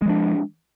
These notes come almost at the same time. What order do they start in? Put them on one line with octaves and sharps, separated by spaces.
G#3 F3 D4